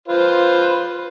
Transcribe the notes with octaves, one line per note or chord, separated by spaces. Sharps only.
F4 B4 C5